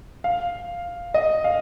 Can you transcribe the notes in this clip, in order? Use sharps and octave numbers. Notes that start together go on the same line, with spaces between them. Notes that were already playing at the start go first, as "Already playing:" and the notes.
F5
D#5
F5